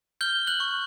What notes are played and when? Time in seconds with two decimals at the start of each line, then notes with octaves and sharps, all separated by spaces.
0.21 F6 G6 G7
0.47 F#6 F#7
0.60 C#6